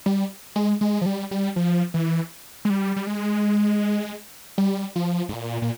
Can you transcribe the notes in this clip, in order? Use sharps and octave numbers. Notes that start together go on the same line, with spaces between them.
G3
G#3
G#3
F3
G3
G3
F3
E3
G#3
G3
G3
G#3
G3
F3
G#2
A#2
A#2